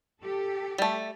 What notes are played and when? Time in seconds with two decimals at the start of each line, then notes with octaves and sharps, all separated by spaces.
0.20 G4 A4
0.78 G3 A3